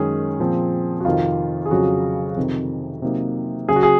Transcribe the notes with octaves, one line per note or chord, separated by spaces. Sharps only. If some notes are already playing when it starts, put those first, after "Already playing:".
Already playing: F#2 D#3 G#3 C#4 G#4
A#2 F3 C4
F#4
F2 C3 D#3 F4
G#4
F2 C#3 F#3 F#4
F2 C3 D#3
C3 F#3 A#3 D#4
C#3 F#3 C#4 G#4
F#4
G#4